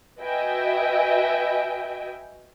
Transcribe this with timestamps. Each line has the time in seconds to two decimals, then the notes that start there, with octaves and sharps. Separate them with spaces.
0.20 F#4 B4 D#5 E5 G5 G#5